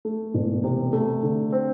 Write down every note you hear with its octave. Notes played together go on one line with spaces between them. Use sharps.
A3
E1
C3
A3
D3
C4